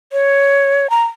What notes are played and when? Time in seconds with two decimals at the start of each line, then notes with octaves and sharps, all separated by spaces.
0.12 C#5
0.90 A#5